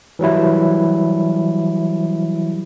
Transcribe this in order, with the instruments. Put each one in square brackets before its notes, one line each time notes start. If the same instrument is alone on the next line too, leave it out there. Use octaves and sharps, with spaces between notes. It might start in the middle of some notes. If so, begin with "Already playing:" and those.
[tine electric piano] E3 F#3 G3 E4